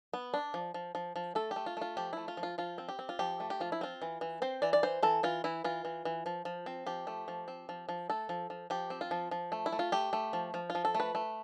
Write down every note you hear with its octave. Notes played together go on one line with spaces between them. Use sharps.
B3
D4
F3
F3
F3
F3
A3 A4
G4
A3
F4
A3 F4
F3 G4
A3 E4
F4
F3
F4
F3 F4
C4
G4
C4
F4
F3 G4
A3
G4
F3 F4
E4
C4 F4
E3
E3
C4 C5
E3 D5
D5
E3 C5
E3 A4
E3 F4
E3 E4
E3 F4
E3
E3
F3
F3
C4
F3 G4
A3
F3
C4
F3
F3
A3 A4
F3
F3
F3 G4
C4
F4
F3
F3
A3
E4
A3
F4
A3 G4
A3
F3
F3
F4
F3
A4
A3
B4
A3